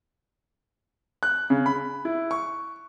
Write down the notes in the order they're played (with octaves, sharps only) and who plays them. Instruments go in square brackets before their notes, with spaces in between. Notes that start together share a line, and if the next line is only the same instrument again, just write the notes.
[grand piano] F#6
C#3
B5
E4
C#6